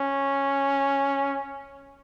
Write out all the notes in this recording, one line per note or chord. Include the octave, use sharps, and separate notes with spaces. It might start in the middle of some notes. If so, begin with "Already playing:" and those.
Already playing: C#4